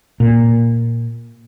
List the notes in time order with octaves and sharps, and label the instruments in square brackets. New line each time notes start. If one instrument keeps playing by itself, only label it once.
[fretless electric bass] A#2